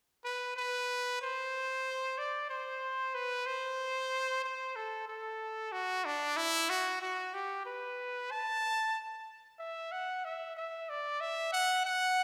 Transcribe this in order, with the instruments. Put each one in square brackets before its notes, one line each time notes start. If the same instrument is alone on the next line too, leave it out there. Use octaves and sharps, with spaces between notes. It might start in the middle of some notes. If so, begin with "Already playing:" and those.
[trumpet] B4
B4
C5
D5
C5
B4
C5
C5
A4
A4
F#4
D4
E4
F#4
F#4
G4
B4
A5
E5
F#5
E5
E5
D5
E5
F#5
F#5